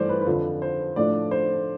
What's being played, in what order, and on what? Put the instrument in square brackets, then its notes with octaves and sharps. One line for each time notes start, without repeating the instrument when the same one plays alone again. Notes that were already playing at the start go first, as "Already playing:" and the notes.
Already playing: [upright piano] G2 E3 A3 C5 D5
B4
B4
F2 D3 F3 A4
C5
A2 F3 A3 D4 D5
C5